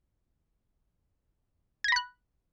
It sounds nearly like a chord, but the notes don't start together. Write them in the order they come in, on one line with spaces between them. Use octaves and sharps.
G#6 A#6 B5 F#6